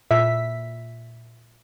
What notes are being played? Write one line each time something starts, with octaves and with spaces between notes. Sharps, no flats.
A#2 E5 B6